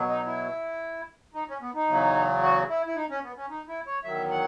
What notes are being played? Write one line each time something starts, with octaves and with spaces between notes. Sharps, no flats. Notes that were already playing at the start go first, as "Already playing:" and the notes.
Already playing: B2 F#3
D#4
E4
D#4
C#4
B3
D#4
E2 C#3 F#3
F#4
E4
E4
D#4
C#4
B3
C#4
D#4
E4
C#5
E2 D#3 F#3 E5
F#5